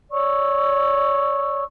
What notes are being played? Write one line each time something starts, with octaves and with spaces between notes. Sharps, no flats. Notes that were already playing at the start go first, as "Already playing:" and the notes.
C#5 D5 C#6 E6